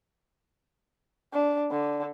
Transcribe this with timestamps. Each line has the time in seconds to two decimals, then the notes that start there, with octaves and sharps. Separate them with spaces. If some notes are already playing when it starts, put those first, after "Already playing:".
1.33 D4
1.71 D3